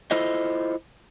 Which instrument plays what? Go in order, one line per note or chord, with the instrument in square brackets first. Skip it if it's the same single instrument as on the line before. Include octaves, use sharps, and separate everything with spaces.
[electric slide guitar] E4 F4 A4 C5 D#5